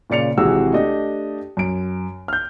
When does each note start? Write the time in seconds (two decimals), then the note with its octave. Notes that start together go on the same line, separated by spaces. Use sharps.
0.10 A#2 C#3 D5 C#7 F7
0.38 G#1 C3 E3 F#4 G#4 E6
0.73 A3 D4 G4 D#5
1.57 F#2 D7
2.28 F6 G6